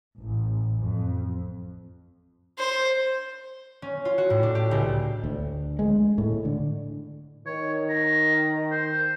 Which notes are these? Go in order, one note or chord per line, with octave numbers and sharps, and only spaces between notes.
A1
F2
C5
C#4
F4
F#4
A2
D4
G4
C#2
D2
G#3
A2
D3
D#3 C#5
A#5
C5